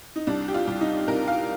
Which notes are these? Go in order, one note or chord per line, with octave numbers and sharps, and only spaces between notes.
D#4
C2 D4
G4
F4
C2
D#4
C2 A#4
F5